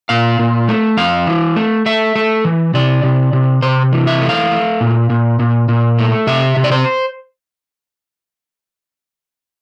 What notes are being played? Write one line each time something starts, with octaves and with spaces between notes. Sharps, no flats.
A#2 F5
A#2
A3
F2 F5
E3
A3
A3 E5
A3
E3
C3 D5
C3
C3
C3 C5
E3
E5
A3
F5
A3
A#2
A#2
A#2
A#2
A3
C3 E5
C3
D5
C5